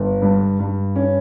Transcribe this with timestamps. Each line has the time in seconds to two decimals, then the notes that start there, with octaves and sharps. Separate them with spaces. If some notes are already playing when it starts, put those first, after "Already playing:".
Already playing: G1
0.22 G2
0.59 G2
0.96 C#4